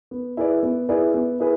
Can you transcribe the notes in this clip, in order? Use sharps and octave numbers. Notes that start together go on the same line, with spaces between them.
B3
E4 G#4 B4 D5
B3
E4 G#4 B4 D5
B3
E4 G#4 B4